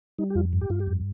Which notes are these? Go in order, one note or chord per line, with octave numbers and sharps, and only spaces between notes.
G3 D#4
G4
F2 F4
G2
G4
G2 F4
G4
F2